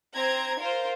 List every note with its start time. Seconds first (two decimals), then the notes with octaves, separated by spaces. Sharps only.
0.15 C4 A#5 G#6
0.60 F4 A#4 C5